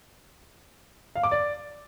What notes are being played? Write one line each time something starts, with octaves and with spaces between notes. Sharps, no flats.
F5
D6
D5